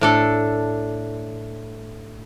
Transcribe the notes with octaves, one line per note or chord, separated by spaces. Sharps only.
A2 D4 A4